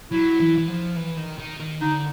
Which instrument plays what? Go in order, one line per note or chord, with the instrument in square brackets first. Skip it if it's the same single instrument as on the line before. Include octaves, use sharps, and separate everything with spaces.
[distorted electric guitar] F#3 [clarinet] E4
[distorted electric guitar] E3
E3
F3
E3
D#3
D#3
D#3
[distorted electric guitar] D3 [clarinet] D#4